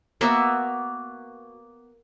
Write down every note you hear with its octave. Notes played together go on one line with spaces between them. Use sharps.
A#3 B3 F#4 E5